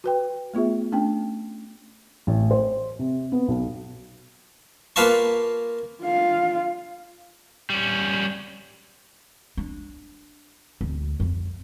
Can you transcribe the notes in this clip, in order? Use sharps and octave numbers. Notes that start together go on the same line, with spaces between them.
F#4 B4 G5
A3 B3 F4 G#4 E5
A3 C#4 D4 G5
A1
C5
C3
B3
B1
A#3 F4 B4 F5 A5 C#6
F4 F5
G3 C#4
D4
D2
F2